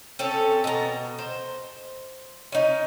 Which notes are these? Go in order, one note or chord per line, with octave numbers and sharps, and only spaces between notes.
C4 C#4 A4
B2 A#5
C5
C#4 D#4